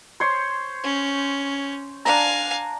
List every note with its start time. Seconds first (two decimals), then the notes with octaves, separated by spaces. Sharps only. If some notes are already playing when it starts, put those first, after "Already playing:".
0.20 C5 C#5 C6
0.83 C#4
2.05 D4 F5 G#5 A#5